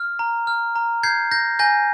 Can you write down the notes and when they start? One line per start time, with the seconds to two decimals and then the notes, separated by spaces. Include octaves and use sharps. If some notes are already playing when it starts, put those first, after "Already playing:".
Already playing: F6
0.19 A#5
0.47 F6
0.76 A#5
1.03 G6 G#6 C7
1.31 G6 A#6
1.59 G#5 G6 A#6